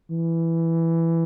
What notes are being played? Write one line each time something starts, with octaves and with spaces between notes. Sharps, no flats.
E3